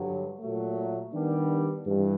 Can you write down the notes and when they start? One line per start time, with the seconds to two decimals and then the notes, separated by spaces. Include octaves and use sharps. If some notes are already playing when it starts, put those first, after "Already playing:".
Already playing: G2 D3 F#3
0.40 A#2 F#3 A3
1.14 D#3 G3 B3 D4
1.86 G2 E3